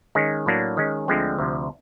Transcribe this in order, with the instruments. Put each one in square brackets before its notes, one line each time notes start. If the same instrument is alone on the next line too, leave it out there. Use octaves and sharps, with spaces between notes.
[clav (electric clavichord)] D#3 G#3 C#4
A2 F#3 A#3 D4
D#3 G#3 C#4
D2 D3 F3 G#3 C4
D2 C3 F3